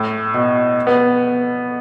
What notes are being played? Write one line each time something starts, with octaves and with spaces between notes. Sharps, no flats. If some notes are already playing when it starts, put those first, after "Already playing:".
Already playing: A2
B2
B3